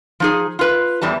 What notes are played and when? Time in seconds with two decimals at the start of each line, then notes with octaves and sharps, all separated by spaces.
0.20 F3 D#4 G#4
0.59 F4 B4
1.02 E2 A2 E3 G3 A5